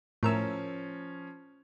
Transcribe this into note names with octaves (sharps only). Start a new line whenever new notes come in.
A2 F3 C#4 A#4 E6